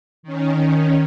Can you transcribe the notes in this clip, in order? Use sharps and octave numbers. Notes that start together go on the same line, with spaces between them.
D#3 C#4